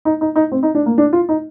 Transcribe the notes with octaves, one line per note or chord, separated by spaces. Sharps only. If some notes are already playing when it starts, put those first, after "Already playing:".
D#4
D#4
D#4
C4
D#4
D4
A#3
D4
F4
D#4